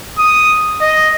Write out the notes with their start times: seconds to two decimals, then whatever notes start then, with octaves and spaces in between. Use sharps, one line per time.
0.19 D#6
0.81 D#5